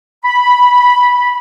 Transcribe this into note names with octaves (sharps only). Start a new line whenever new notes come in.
B5